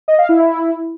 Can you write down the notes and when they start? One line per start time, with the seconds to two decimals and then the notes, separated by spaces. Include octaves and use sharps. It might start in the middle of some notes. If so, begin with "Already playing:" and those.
0.08 D#5
0.18 F5
0.29 E4